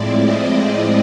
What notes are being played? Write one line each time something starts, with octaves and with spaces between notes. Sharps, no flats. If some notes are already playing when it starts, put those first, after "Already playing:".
Already playing: A2 F3 G#3 C4 E4 D5
D#5